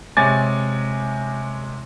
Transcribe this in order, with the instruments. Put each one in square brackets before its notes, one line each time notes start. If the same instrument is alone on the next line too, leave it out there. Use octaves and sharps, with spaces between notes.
[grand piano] C3 G#3 C#5 G#5 D6 A6